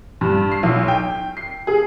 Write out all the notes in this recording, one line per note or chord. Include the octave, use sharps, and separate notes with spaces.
G2
C7
B1
G5
C7
G#4